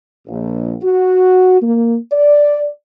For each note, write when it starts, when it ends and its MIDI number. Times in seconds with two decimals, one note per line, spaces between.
0.27 0.76 34
0.82 1.59 66
1.62 1.97 58
2.12 2.67 74